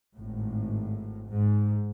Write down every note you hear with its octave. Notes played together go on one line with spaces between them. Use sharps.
G#1 A2
G#2